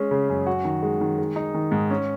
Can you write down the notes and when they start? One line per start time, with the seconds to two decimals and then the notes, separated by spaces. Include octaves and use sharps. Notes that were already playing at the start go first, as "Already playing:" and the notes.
Already playing: G#3 C#4
0.11 C#3
0.29 F#2
0.46 F#4
0.65 D#3
0.82 G#3
1.01 D#3
1.18 G#3
1.36 D#4
1.54 D#3
1.72 G#2
1.90 C#4